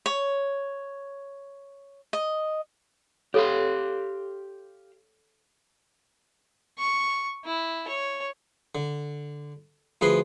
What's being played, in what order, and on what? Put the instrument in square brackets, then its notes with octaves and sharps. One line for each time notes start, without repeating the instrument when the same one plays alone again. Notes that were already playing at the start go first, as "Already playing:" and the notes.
[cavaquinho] C#5
D#5
[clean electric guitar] G4 F5 C6 [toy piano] A4 C#5
[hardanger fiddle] C#6
E4
C#5
[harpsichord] D3
D2 F3 G#4 B4 G#5 C6